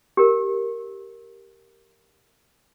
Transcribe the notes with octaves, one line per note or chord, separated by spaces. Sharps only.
G4 A#4